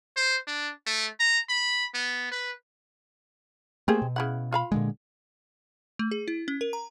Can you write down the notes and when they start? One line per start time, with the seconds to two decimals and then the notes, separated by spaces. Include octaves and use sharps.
0.16 C5
0.47 D4
0.86 A3
1.20 A#5
1.49 B5
1.94 B3
2.31 B4
3.88 A3 A#3 C4 G4 G#4
4.02 B2
4.16 C#3 E4 F#5
4.52 F4 F5 B5
4.72 A#2 D3 G#3
5.99 A3
6.11 G#4
6.28 E4
6.48 C#4
6.61 A#4
6.73 A#5